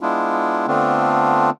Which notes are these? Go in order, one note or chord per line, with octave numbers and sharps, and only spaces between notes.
G#3 B3 D4 E4 F4
D3 A3 B3 C4 D4 F4